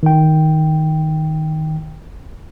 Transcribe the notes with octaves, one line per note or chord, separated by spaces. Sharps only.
D#3 G5